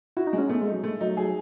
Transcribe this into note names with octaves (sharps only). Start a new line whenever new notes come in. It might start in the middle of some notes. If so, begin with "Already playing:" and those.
E4 F#4
D#4
G#3
C#4
A3 B3
G#3
F#3 D#4
G#3 A3
F#3 D#4
F#3 G#4